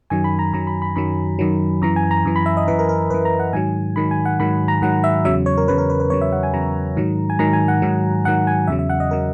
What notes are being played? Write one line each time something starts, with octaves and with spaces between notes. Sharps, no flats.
F#2 D#3 F#3 G#5
B5
A#5
F#2 D#3 F#3 A#5
B5
B5
F#2 D#3 F#3 B5
F#2 D#3 F#3
F#2 E3 A#5
G#5
A#5
F#2 E3
B5
E5
D#5
F#2 E3 B4
A#4
A#4
F#2 E3 B4
A#5
F#5
G#2 D#3 F#3 G#5
G#2 D#3 F#3 B5
G#5
F#5
G#2 D#3 F#3 B5
A#5
G#2 D#3 F#3 F#5
E5
E2 C#3 F#3 E5
C#5
A#4
E2 C#3 F#3 B4
A#4
B4
B4
E2 C#3 F#3 C#5
E5
F#5
G#5
E2 C#3 F#3 A#5
G#2 D#3 F#3
G#5
G#2 D#3 F#3 A#5
G#5
F#5
G#2 D#3 F#3
G#2 D#3 F#3 F#5
G#5
E2 C#3 F#3 E5
E5
F#5
D#5
C#3 F#3 A#4